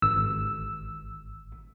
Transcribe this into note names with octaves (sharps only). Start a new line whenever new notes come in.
G#1 E6